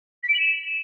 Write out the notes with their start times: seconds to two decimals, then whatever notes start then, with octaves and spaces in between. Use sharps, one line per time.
0.23 B6
0.28 D7
0.34 F#7
0.39 E7